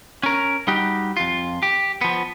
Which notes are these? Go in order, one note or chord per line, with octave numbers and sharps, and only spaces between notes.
C#4 A#4
G3 D#4 F#4 G4
F2 F4
G4
F3 B3